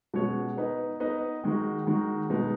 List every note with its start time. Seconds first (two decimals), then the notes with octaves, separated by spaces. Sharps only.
0.14 B2 G#3 C#4 F#4 C#5
0.57 B3 D#4 B4 D#5
1.00 B3 D#4 B4 D#5
1.43 D#3 G#3 D#4 F#4
1.86 D#3 G#3 D#4 F#4
2.30 B2 G#3 B3 D#4